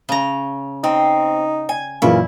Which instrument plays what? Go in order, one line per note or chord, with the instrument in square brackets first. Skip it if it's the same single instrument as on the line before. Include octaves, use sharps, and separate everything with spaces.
[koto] C#3 A#5
[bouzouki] C4 [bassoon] D#4
[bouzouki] G#5
[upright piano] F#2 A#2 E3 [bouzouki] C#3 [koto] E4 [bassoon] F4